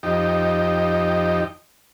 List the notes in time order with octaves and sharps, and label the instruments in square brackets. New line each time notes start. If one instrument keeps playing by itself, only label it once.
[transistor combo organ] F2 D#4 G4